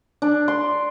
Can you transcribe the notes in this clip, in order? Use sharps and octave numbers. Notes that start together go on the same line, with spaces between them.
D4
C6